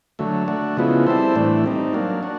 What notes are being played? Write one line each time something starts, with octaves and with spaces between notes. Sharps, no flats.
D3 F#3 A3
A3 D4 F#4
C#3 F3 G#3 B3 E4
G3 C4 E4 A4 C5
A2 E3 A3 D4
G3 C4 D#4
F#3 A#3 D4
D4 F#4